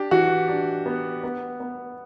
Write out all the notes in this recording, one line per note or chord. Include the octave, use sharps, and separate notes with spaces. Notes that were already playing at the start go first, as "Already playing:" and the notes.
Already playing: D4 G4
E3 F#4
D4
B3
B3
B3